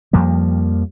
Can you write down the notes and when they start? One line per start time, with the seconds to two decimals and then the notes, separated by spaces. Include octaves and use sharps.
0.13 F2 F3 G3 A#3